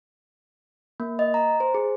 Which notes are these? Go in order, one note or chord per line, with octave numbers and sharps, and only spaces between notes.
A#3
D#5
A#5
C5
G#4